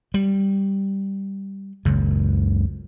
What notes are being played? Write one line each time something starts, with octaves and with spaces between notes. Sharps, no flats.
G3
F#1 C#2 F#2